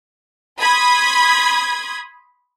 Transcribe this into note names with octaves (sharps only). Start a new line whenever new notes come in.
B5 C6 D#6 G#6